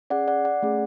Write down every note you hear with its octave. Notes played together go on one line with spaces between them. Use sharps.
C#4 G#4 D5 F#5
D5 F#5
D5 F#5
A3 C#4 G#4